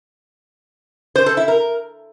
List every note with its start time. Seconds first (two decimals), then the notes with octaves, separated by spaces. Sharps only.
1.16 C5
1.26 A4
1.37 E4
1.48 A#4